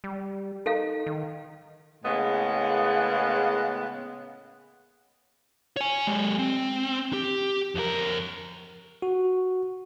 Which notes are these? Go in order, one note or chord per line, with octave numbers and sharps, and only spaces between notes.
G3
D#4 A4 A#4 F5
D#3
A2 C#3 G#3 A#3 B3
C#5 G#5
G#3 G4
C4
G4
F2 A#4
F#4